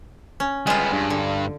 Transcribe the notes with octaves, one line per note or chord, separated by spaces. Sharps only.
C#4
G3 G#3 B3 F4
G2
D3